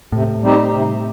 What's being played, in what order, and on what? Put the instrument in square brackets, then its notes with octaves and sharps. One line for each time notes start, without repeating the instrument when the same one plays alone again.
[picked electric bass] A2 [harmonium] C3
[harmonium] G3 C4 D#4 G4
C3